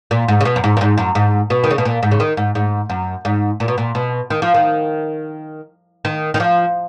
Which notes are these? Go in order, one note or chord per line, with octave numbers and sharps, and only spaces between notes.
A#2
G#2
C#3
B2
F#2
G#2
F#2
G#2
F#2
G#2
B2
D#3
C#3
B2
A#2
G#2
C#3
D#3
G#2
G#2
F#2
G#2
A#2
B2
A#2
B2
D#3
F3
D#3
D#3
D#3
F3